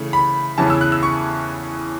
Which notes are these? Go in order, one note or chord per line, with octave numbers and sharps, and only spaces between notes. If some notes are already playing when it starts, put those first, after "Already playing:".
Already playing: C#3 E3 A3
B5
E2 C#3 E3 C#4 E4 A5
E6
F#6
E6
C#6